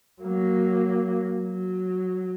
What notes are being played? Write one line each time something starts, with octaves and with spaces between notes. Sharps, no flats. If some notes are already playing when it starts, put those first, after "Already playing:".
F#3 A#3
F#3